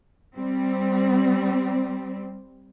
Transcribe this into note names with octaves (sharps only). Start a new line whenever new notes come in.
G3 C4